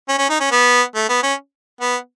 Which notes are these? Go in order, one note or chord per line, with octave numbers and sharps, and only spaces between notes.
C#4
C#4
D#4
C#4
B3
A3
B3
C#4
B3